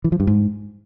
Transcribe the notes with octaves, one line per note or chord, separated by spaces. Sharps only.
E3
F3
G2
G#2